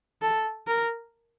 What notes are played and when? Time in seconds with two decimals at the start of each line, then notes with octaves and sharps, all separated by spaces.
0.22 A4
0.67 A#4